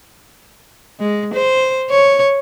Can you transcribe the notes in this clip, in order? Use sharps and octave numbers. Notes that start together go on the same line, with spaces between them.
G#3
C5
C#5